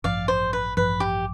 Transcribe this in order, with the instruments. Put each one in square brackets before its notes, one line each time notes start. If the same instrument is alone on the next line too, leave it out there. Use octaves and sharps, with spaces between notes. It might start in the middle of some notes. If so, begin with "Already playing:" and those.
[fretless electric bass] A1 G2 F3 [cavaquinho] D5 F5
[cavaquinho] C5
B4
[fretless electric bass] A1 G2 F3 [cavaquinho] B4
[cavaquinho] G4